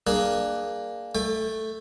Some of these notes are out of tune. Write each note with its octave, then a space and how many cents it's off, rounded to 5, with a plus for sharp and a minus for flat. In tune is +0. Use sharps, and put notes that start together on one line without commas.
A#3 +0 D4 +20 G#4 +0
A3 +0 G5 +35